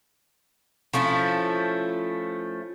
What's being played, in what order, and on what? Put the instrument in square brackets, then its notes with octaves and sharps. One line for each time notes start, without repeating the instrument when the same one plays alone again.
[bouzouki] F3 A3 C#4 E4